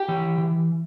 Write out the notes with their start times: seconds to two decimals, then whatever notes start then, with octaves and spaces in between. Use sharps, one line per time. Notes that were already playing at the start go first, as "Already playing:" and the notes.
Already playing: G4 G5
0.08 E3
0.38 E3